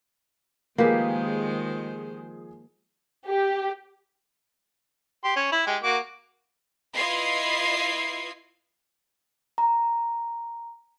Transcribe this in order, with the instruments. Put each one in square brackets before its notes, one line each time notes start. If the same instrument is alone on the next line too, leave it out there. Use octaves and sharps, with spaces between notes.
[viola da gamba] D#3 G#3 C5 [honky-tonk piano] F3 G#4 [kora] A#3 G4 B4
[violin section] G4
[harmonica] G4 C6
C#4
E4
G#3 G4
A#3 F#4 D6
[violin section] E4 F4 B4 D#5 G#6 C7
[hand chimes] A#5